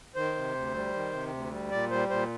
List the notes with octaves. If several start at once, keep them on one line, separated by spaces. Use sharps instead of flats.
D#3 C5
C3
D2
G3
D#3
C3
D2
G3
A#2 D5
G3 C5
A#2 C5